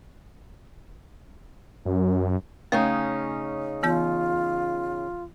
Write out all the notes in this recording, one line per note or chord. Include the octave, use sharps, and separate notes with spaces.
F#2
C#3 A3 C#4 D#4
E3 B3 F4 G6